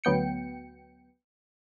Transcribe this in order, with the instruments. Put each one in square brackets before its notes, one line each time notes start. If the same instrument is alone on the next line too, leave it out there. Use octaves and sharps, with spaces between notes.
[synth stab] D2 F#3 B3 G5 C#7